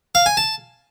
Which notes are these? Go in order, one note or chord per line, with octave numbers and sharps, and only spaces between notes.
F5
G#5
A5